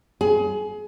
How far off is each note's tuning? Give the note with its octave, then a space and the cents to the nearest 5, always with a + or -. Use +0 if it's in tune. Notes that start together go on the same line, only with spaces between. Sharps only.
G#4 +25